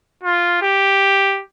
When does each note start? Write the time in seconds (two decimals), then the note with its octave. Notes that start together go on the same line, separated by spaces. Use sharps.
0.23 F4
0.62 G4